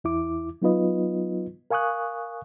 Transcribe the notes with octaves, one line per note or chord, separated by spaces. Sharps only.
E2 E4 D6
F#3 B3 D#4 F4 B4 D#5
A#4 F5 G#5 C#6 D#6 F#6